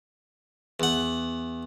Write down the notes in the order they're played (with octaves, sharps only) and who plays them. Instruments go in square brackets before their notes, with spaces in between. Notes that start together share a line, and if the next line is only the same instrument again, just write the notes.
[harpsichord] E2 F#5